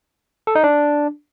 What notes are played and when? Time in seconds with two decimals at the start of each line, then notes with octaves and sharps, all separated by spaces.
0.47 A4
0.55 D#4
0.64 D4